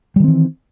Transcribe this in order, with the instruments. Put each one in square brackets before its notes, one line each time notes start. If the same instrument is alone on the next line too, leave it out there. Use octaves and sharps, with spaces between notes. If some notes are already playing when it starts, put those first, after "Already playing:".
[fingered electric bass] G3
D#3
C4
E3